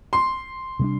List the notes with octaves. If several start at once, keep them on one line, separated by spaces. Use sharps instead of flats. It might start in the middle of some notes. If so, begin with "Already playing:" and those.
C6
C3 G3 D4